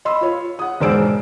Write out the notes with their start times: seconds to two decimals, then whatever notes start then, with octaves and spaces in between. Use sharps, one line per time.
0.05 D#5 B5 C6 E6
0.21 F4 C#5
0.59 F#5 D#6
0.80 E1 G#2 C5 D5 E6 D7